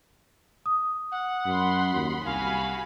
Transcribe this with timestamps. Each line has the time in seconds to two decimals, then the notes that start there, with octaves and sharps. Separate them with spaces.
0.66 D#6
1.11 F#5
1.46 F#2 B5 C6
1.94 D#2
2.25 C2 F#4 F5 G#5 B5